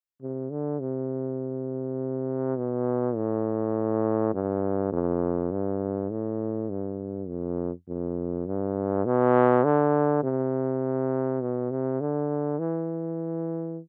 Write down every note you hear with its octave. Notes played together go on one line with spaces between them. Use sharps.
C3
D3
C3
B2
A2
G2
F2
G2
A2
G2
F2
F2
G2
B2
D3
C3
B2
C3
D3
E3